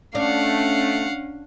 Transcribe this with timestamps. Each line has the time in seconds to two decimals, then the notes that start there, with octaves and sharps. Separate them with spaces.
0.15 A3 C#4 D4 F5 F#5